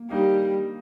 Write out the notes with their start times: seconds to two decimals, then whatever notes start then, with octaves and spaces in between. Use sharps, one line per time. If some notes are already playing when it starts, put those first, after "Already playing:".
Already playing: A#3
0.10 G3 A#3 D#4